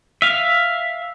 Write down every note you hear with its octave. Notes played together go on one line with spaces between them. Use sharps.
E5 F5